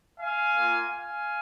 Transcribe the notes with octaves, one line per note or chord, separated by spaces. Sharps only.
F5 G#5
A#3 F4
F5 G#5